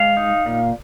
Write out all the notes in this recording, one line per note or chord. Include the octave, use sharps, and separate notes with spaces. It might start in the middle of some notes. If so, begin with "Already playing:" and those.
Already playing: G#3 F5
D#4
A#2